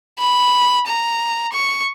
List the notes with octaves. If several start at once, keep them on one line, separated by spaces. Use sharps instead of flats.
B5
A#5
C#6